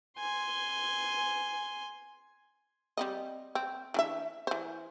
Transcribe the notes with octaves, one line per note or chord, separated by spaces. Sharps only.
G#5 C6
G3 C4 D#5
C4
E3 D4 E5
E3 C5